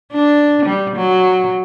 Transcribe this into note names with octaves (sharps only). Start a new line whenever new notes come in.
D4
G3
F#3